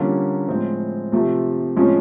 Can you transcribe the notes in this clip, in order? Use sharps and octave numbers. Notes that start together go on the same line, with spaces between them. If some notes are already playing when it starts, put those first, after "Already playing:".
Already playing: D3 G3 A#3 C#4 F4
A2 F3 G#3 C4 F4
C3 F3 A3
A2 F3 G#3 C#4